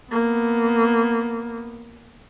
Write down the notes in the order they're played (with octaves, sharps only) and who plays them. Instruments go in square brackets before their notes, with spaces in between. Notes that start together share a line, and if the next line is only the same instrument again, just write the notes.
[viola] A#3 B3